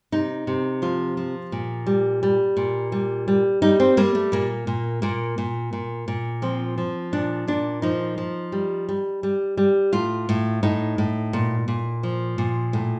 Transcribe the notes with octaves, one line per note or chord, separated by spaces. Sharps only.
C3 D#4
C3
F3 F4
F3
A#2
G3
G3
A#2
G3
G3
G3 D#4
C4
G3 A#3
A3
A#2 A#3
A#2
A#2 A#3
A#2
A#2
A#2
F3 C4
F3
A#2 D4
A#2 D4
F3 D#4
F3
G3
G3
G3
G3
A2 F4
A2
A2 D#4
A2
A#2
A#2
F3
A#2
A2